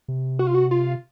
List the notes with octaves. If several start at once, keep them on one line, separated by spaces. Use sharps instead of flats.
C3
F#4
F4
F#4
F4